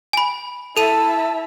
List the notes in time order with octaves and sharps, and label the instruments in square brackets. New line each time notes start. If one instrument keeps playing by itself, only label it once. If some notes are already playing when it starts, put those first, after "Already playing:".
[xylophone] G#5 B5
[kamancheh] E4 E5 [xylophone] A4 D#7 [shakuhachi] A5